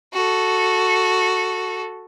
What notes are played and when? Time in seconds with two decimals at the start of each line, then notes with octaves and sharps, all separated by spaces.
0.14 F#4 A4